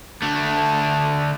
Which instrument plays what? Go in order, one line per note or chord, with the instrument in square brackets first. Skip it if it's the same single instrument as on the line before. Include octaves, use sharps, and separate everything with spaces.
[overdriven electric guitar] D3 A3 [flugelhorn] A5